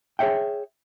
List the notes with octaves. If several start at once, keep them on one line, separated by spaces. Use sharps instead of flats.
G#4 C#5 E5 G5